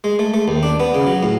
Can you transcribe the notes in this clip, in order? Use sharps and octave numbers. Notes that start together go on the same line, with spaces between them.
G#3
A3
A3
D#2
D4
B3
C#3
F#3
A2